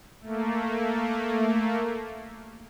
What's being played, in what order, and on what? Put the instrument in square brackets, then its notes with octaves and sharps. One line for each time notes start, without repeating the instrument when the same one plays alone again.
[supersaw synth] A3 A#3